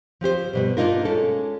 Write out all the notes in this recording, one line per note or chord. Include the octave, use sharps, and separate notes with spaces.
F3 C4 G4 C5
G2 B2 G3
A#3 D4 D#4 F4 A#4
G#3 C#4 A4